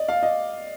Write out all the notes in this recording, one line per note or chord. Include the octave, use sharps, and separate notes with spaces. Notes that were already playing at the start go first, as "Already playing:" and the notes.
Already playing: D5 D#5
F5
D#5